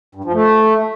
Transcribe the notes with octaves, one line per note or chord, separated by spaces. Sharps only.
G2
F3
A3